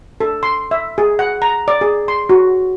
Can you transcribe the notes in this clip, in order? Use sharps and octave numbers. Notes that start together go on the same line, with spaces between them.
A4
C6
E5
G#4
F#5
A#5
D5
G#4
C6
F#4